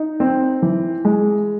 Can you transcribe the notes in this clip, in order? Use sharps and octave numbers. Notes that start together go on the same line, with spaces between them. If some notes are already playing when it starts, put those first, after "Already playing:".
Already playing: D#4
C4
E3
G#3